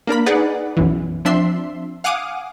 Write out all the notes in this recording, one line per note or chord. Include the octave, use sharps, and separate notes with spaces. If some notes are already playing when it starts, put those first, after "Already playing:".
A#3 D4 A#4 B5
D#4 G#4 B4 D5 F#5
B1 F#2 E3
F3 C4 D4 E5 C6
F5 F#5 G#5 D6 D#6